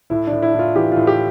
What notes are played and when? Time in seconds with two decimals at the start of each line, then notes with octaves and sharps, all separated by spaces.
0.10 A2 E4
0.27 A2 D4
0.42 E4
0.54 A2
0.59 F4
0.75 E3 G4
0.92 A2 F4
1.07 G4